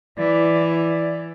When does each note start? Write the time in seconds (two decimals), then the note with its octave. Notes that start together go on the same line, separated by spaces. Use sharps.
0.18 E3 D5
0.71 D5